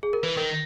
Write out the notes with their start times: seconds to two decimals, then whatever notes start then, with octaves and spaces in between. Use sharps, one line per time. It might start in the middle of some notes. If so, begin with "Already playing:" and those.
0.03 G#4
0.13 A#4
0.23 E3 B4
0.37 D#3 A#4